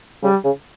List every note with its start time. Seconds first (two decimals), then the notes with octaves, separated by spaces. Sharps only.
0.22 C#3 G3
0.45 C#3